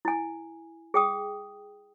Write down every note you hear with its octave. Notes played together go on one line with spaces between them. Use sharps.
E4 G#5
G#4 G5 D#6